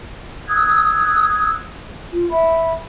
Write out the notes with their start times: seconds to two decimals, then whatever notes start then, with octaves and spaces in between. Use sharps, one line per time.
0.49 D#6 E6 F#6 G#6
2.12 F4
2.30 E5 B5